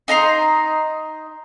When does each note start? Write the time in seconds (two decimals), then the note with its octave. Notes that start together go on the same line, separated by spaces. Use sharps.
0.08 D#4 D#5 A#5 C6